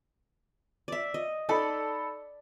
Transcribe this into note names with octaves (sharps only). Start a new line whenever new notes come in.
D5 E5
D#5
D#4 A4 D5 B5